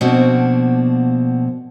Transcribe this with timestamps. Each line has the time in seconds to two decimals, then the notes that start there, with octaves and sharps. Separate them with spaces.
0.01 B2 F3 A#3 C4 D4 F#4